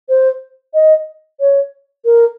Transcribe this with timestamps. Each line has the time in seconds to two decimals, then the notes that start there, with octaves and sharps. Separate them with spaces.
0.09 C5
0.74 D#5
1.40 C#5
2.05 A#4